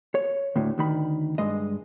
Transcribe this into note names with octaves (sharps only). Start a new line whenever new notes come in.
C#5
D2 A2
D2 D#3 B5
G2 G#3 D#5